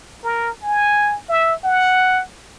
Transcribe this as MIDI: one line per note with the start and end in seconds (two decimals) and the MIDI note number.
0.24 0.50 70
0.63 1.20 80
1.29 1.55 76
1.64 2.23 78